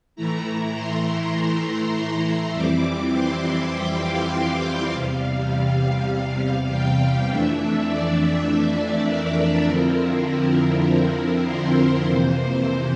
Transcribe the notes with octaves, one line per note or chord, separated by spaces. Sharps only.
A2 E3 A3 E4 A#5
C6
C6
F2 E3 G3 C4 E4 D6
C6
G5
F5
E2 C3 G3
F5
G5
F2 E3 A3 D4 E5
E5
D5
A#4
F2 D3 F3 C4 E4
A#4
C5
F2 C3 E3 A#3 C5